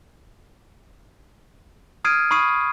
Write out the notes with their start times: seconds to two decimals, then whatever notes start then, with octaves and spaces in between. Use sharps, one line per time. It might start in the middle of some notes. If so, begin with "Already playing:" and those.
2.05 D#6 F6 G#6 C7 D7 D#7
2.31 B5 C#6 D#6 C7 D#7